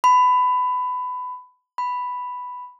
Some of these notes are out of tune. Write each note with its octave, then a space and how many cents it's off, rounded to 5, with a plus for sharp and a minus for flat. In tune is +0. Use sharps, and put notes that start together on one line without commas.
B5 +20
B5 +5